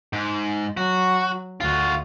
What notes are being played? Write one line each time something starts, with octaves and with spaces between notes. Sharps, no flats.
G#2
F#3 F#4
D2 F4 F#4